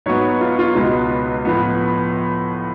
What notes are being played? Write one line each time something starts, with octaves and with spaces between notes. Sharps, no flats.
G#2 F#3 B3 C#5
F4
F4
C#2 B2 G#3 B3 F4
A2 F3 B3